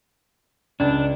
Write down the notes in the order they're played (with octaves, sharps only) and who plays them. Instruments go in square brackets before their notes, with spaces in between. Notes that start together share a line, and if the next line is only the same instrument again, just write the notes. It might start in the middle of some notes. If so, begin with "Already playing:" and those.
[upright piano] C#2 [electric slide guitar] D4